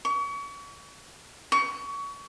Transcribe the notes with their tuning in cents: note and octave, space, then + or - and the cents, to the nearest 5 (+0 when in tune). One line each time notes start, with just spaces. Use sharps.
C#6 +35
C#6 +25